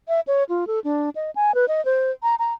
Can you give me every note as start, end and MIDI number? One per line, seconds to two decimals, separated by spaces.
0.08 0.20 76
0.27 0.44 73
0.49 0.67 65
0.67 0.80 69
0.84 1.10 62
1.16 1.31 75
1.36 1.54 80
1.55 1.66 71
1.68 1.84 75
1.85 2.11 72
2.23 2.35 82
2.39 2.54 82